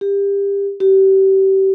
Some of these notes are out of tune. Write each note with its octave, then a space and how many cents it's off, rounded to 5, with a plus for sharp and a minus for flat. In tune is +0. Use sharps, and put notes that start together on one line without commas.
G4 +30
G4 -30